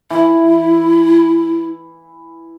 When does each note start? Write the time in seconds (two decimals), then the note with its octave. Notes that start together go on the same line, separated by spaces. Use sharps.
0.10 E3 E4